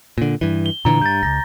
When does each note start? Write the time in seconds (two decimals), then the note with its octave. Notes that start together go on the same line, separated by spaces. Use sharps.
0.18 A#2 D3
0.41 G2 E3
0.66 G7
0.85 A#2 D3 E3 A#5
1.02 G2 G6 A6
1.23 D1 C#2 A#6